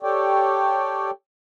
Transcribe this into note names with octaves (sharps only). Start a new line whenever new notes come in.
G4 A4 C#5 D5 G5